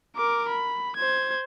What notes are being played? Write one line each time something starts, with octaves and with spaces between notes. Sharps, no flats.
A#4 D6
B5
C5 G#6